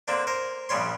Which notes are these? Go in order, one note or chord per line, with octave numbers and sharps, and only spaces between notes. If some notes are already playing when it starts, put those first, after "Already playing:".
D3 A#3 C4 D4
A#4 C5
A#1 C#3 G3 C#5 C6